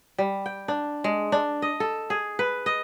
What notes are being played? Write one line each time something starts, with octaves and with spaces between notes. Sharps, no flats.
G3
G5
D4
G#3
D4
D#5
A4
G#4
B4
D#5